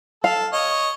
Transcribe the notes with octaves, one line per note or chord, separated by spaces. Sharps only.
A4 F5
C#5 D#5